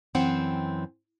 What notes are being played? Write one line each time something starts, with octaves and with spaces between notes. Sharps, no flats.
F#2 E3 C4 C5 F#5 G5